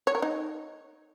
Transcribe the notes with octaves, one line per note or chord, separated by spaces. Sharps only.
C#5
A#4
D#4